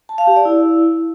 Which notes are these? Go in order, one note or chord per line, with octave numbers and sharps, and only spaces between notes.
A5
F5
G4
D5
E4